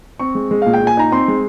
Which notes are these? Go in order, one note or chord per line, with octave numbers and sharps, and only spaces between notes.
C4 C#6
G#3
G#3
A#2 F5
G5
A#2
G#5
D#4 A#5
C4 C6
G#3